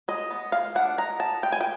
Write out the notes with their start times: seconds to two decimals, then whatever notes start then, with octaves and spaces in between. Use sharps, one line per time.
0.08 G#3 D#5
0.31 B3
0.52 G#3 F5
0.75 D4 F#5
0.98 G#3 A#5
1.20 B3 A5
1.42 G#3 G5
1.52 G#5
1.61 G5